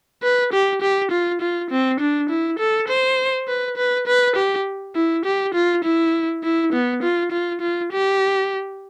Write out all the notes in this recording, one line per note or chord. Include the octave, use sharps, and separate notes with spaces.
B4
G4
G4
F4
F4
C4
D4
E4
A4
C5
B4
B4
B4
G4
E4
G4
F4
E4
E4
B3
F4
F4
F4
G4